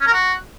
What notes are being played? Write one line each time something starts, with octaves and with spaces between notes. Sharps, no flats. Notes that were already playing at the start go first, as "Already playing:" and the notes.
C#4
A#4
F#4